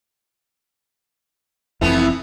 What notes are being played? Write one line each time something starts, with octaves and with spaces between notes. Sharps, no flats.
F1 F2 E3 A3 B3 C4 E4